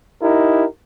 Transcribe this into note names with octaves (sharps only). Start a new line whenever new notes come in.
D#4 E4 G4 A#4